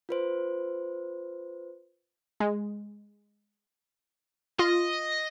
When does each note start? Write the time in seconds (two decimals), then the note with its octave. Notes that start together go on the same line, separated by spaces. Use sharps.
0.09 F4 B4 C5
2.40 G#3
4.59 F4 D#5